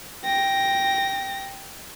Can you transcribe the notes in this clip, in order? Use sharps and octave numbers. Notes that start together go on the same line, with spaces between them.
G5 A#6